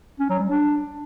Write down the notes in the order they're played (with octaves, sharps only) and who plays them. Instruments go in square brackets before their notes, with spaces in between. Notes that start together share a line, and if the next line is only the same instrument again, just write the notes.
[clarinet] C#4
F#3
G3
D4